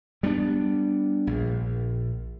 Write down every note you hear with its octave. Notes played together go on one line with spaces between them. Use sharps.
G3 B3 C4 D4
A#1